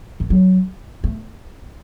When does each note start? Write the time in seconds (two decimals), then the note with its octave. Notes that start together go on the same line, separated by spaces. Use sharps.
0.20 D#3
0.30 F#3
1.04 A3